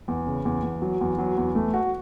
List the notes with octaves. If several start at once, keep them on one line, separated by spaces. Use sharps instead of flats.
E2
C#3
E2
E2
F#3
E2
F#3
E2
A3
F#4